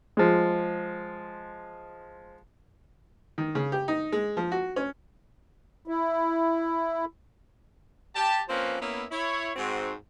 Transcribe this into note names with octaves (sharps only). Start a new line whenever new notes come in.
F3 G#3
D#3
C#3
G4
D#4
G#3
F3
F#4
C#4
E4
G4 A5
F3 A#3 C4 C#4 B4 C5
A#3 B3 C#4 E4
E4 C#5
G#2 C4 F#4